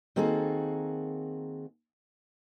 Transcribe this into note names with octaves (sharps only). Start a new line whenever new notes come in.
D#3 A#3 C4 F#4 G#4 A4